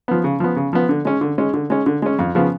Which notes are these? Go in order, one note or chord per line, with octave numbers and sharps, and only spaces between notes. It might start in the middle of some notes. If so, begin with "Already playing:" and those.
F3 B3
C#3
F3 B3
C#3
F3 B3
D3
G#3 C#4
D3
G#3 C#4
D3
G#3 C#4
D3
G#3 C#4
F2
C#3 F3 B3